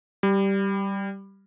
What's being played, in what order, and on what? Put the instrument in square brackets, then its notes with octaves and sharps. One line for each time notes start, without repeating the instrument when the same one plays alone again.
[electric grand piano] G3